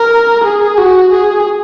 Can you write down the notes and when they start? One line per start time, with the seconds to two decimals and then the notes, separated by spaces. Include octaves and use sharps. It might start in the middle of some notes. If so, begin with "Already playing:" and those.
Already playing: A#4
0.44 G#4
0.78 F#4
1.13 G#4